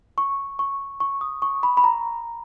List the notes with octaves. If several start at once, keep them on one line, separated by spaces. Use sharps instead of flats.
C#6
C#6
C#6
D#6
C#6
B5
B5
A#5